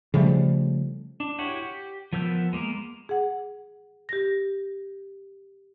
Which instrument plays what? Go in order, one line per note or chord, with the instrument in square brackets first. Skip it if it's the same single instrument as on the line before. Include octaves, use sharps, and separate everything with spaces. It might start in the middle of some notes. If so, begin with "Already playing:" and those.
[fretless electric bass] C#3 F3 G3 A3
[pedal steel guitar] D4
E4 F#4 G4 C#5 F#5
G4
F3 B3 A#4 E6 G6
G#3 A#3 B3 A#4
[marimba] G#4 F#5
G4 A#6